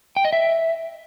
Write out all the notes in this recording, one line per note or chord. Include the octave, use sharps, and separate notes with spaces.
G5
D#5
E5